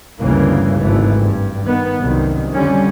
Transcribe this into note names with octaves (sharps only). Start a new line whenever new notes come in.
G1 D2 G2 C#3 E3 A#3
G#1 E3 A3
G2
D#3 B3
C2 F#2 D#3
F2 D3 G3 C#4